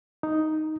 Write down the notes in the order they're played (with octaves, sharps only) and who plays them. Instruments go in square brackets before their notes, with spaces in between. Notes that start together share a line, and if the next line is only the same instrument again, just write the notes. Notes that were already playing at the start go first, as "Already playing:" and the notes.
[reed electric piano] D#4